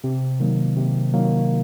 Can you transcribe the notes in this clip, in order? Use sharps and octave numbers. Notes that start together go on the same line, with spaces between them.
C3
D#3 F#3 A#3
C3
D#3 F#3 A#3